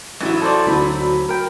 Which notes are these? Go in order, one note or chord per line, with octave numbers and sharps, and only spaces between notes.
A1 F#3 E4
A4 C5 D5
D2 F#3 B5
A#4 G5